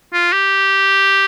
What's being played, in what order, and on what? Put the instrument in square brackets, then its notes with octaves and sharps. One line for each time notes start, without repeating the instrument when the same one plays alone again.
[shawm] F4
G4